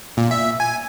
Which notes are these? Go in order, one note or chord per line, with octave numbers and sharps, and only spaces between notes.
A#2
E5
G#5